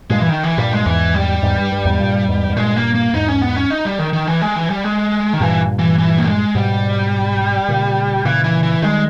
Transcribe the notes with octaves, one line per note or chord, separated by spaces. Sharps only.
G2 A#2 G#3
E3
D#3
E3
G2 A#2 G3
G#3
E2 G#2 E3
G3
E2 G#2
G2
G2
E2 G#2
G2 A#2
E2 G#2
G#2
G2 A#2 G#3
A#3
A#3
E2 G#2 D#4
C#4
B3
C#4
D#4
G3
D#3
D#3
E3
G#3
E3
G3
G#3
D#3
G2 A#2 E3
E3
E3
A#3
G#3
G#2 B2 G3
A#2 C#3
A#2 C#3 E3
E3
E3
D#3 G3 G#3